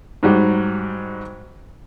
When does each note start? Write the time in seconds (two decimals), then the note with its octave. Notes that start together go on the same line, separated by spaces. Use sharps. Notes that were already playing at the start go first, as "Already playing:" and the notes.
0.23 G#2 F#3 G3